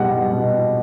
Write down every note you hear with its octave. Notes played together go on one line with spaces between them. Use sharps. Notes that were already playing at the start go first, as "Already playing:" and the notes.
Already playing: B2 G3 F#5
B2